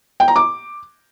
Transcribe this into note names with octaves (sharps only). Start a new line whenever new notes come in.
G5
A#5
D6